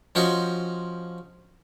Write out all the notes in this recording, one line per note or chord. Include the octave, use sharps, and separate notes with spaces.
F3 C#4 F#4 C5 C#5 D#5